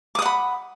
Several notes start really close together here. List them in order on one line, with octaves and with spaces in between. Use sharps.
D6 D#6 F#5 B5